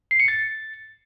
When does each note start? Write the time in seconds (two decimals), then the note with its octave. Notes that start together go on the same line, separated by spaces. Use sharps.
0.11 C7
0.20 C#7
0.28 A6